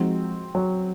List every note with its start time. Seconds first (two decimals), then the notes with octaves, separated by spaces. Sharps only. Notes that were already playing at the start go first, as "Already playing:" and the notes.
Already playing: F3 G#3 C4 D#4 F#4
0.55 F#3